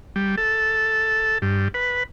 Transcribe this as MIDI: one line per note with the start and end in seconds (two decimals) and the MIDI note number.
0.16 0.36 55
0.38 1.38 69
1.42 1.68 43
1.74 2.03 71